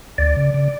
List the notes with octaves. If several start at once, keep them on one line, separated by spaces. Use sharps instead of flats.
D2 D5
C#3
C#3